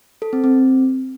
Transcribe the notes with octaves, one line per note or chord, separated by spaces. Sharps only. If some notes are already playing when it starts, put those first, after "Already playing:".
A4
C4
C4